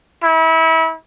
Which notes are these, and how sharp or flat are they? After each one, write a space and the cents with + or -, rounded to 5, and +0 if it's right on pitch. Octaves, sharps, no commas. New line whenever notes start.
E4 -30